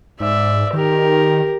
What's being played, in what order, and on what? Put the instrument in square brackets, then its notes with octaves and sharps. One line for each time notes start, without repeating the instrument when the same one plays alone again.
[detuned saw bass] G#2 [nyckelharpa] D5 E5
[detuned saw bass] D#3 [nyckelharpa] G4 A#4